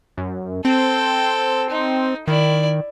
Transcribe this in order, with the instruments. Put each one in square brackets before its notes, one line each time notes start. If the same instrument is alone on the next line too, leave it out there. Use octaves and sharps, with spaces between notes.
[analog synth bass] F#2
[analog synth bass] C4 [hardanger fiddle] A4 G5
[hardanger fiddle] D#4
[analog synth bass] D#3 [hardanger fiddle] E4 D5